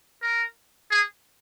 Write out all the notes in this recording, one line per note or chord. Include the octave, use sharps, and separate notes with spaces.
A#4
G#4